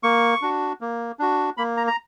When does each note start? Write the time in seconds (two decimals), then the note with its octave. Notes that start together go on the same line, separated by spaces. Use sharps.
0.03 A#3 C#6
0.42 D4 F#4
0.81 A#3
1.19 D4 F#4
1.57 A#3 B5
1.77 A#5
1.87 A#5